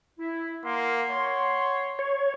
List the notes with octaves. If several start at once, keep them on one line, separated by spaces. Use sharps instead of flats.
E4
A#3 F#5 C6
C#5
C#5